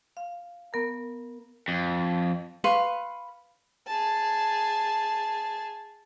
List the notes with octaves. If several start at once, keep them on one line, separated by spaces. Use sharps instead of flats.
F5
B3 A#4 A#5
F2
B4 F5 C6 C#6
G#4 A5